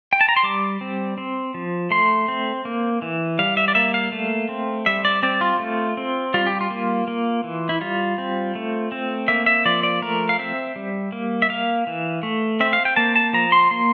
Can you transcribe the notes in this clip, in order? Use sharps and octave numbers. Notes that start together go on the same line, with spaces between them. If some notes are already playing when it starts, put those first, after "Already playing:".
G5
A5
A#5
C6
G3 D6
C4
C4
F3
A3 C6
C4
A#3
E3
G3 F5
E5
D5
A#3 E5
F5
A3
C4
G3 E5
D5
C4 D5
F4
A3
C4
G3 F4
G4
F4
A#3
A#3
E3
E4
G3 F4
C4
A3
C4
A#3 E5
E5
F3 D5
D5
A3 A#4
F5
C4 E5
G3
A#3
E5
A#3 F5
E3
A3
C4 E5
F5
G5
A#3 A5
A5
F3 A#5
C6
A#3 C6